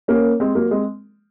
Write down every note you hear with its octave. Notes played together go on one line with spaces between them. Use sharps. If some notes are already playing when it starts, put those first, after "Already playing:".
A#3 C#4
G#3 C4
F#3 A#3
G#3 C4